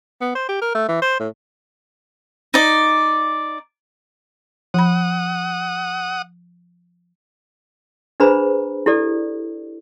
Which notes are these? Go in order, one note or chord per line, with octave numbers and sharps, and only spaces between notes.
B3
C5
G4
A#4
A3
E3
C5
A2
D#4 D5
F3 F#5 B5 D#6
D4 G#4 B4 C5 A#5 B5
E4 G4 A4 D5